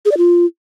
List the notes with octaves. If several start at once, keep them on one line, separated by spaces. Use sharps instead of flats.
G#4
D5
F4